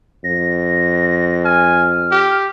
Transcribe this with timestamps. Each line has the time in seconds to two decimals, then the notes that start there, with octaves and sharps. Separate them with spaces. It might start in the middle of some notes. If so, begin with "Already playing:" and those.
0.24 F2 A#6
1.45 G#5 F6
2.11 G4